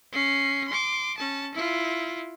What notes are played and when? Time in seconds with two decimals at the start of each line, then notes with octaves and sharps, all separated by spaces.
0.12 C#4 C7
0.68 C6 D6
1.18 C#4 A5
1.54 E4 F4